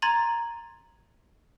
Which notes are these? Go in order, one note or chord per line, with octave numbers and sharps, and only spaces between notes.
A#5 C6 G#6 A6 D#7 F#7